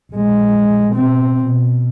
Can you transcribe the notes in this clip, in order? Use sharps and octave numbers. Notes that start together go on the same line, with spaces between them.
A#1 G#3
B2 C4
B2